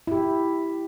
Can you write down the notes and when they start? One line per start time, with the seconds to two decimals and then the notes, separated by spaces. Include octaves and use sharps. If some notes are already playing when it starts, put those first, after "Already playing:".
0.07 E4 G4